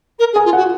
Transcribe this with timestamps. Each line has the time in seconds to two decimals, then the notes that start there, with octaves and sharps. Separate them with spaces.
0.19 A#4
0.33 G#4
0.36 G#5
0.45 F4
0.53 F#4 F#5